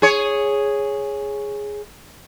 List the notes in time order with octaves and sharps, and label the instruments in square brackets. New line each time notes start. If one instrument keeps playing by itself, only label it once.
[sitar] G#4 C#5